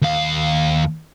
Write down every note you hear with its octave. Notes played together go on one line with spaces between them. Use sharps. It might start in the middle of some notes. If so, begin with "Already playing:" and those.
D#2 F5